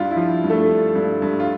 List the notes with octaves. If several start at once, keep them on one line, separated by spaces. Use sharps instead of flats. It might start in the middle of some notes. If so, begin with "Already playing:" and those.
Already playing: G2 F4
E4
F3
G2
A3 A4
G2
G2
G2
F4